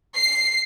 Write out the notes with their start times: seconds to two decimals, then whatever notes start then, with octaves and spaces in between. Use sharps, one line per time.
0.16 C7